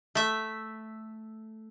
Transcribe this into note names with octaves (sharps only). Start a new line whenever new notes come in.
A3 E5